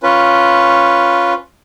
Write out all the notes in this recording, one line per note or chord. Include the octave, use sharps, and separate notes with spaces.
C#4 F4 B4